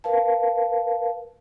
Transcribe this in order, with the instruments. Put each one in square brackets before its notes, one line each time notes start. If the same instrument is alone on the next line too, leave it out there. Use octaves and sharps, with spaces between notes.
[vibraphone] A#4 B4 F5 A5